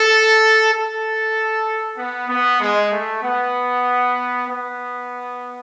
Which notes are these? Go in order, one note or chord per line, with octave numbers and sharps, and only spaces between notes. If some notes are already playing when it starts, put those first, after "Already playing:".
Already playing: A4
A4
B3
B3
G#3
A3
B3
B3